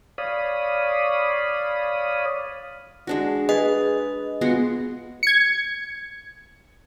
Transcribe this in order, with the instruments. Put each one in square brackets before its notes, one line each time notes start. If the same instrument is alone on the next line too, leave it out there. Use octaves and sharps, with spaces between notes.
[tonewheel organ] C#5 D5 F5 B5 D#6
[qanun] G#3 D4 F#4
[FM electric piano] G#4 [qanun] B4 [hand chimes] D#5
[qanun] G#3 F4 F#4 [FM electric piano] B3 C#7
[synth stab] G#6 C#7